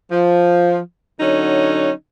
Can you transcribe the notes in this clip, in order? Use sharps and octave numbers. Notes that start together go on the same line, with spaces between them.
F3
D3 F#3 C#4 D#4